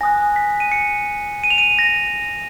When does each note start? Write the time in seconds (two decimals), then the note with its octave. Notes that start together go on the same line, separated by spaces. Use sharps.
0.01 G#5 D#6 F#6 A#6
0.36 B6
0.60 D#7
0.72 C#7
1.44 D#7
1.50 F7
1.58 D#7
1.79 A#6